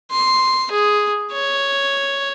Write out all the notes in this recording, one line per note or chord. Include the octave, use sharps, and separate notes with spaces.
C6
G#4
C#5